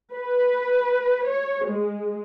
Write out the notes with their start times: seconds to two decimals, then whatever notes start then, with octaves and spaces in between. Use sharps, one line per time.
0.13 B4
1.28 C#5
1.66 G#3